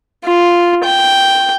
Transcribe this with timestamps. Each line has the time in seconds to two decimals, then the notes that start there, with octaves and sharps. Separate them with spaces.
0.25 F4
0.84 G5